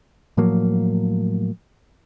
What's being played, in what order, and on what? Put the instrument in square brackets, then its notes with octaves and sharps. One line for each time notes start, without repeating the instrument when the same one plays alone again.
[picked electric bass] A2 F3 F#3 A#3